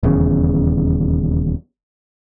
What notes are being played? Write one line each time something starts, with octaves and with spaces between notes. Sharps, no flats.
D#1 E2 C#3